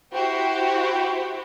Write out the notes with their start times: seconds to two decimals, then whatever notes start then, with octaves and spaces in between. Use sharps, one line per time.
0.13 E4 F#4 G4 C5